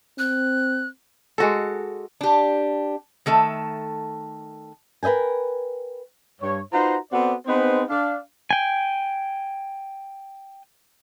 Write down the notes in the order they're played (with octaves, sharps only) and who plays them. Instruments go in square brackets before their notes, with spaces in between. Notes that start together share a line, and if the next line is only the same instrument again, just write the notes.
[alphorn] C4 [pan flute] F#6
[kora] G#3 F#4 A4
[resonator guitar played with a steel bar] D4 G4
D#3 A3 A4 E5
[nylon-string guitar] A#4 B4 D#5 G5 G#5
[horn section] G2 C#5
D#4 F4 F#4 B4 C5 A#5
B3 C4 F#4 A4 C5 D5
B3 C4 D#4 G#4 B4 C5
D4 F5
[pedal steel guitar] G5 G#5